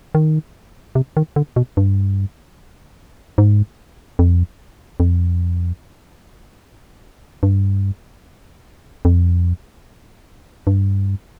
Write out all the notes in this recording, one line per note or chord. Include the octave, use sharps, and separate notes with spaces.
D#3
C3
D#3
D3
B2
G2
G#2
F2
F2
G2
F2
G2